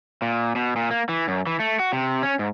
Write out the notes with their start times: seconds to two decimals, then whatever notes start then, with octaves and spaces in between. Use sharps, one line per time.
0.22 A#2
0.55 B2
0.76 A#2
0.91 A#3
1.09 E3
1.28 F#2
1.47 E3
1.60 A3
1.79 F#4
1.93 C3
2.23 C#4
2.39 G#2